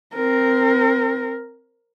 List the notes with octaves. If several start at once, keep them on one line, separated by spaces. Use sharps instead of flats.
C4 A#4